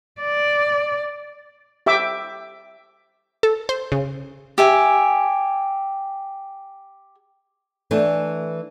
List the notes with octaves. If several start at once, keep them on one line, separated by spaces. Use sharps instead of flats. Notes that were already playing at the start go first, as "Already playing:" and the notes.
D5
G4 E5 G5 D6
A4
C5
C#3
G4 E5 G#5
E3 A3 D4